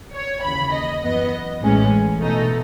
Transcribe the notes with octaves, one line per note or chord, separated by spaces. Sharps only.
C#5
D#2 C#3 E3 B5
D#5
F#2 E3 B3 D#5
A1 A2 E3 G#3 C#4
B2 A3 D#4 A4